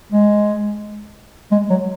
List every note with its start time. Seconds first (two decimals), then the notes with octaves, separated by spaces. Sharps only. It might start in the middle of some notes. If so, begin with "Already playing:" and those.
0.13 G#3
1.52 G#3
1.70 F#3